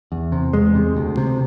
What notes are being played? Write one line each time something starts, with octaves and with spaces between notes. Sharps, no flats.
E2
C3
E2 G#3
C3
D2
C3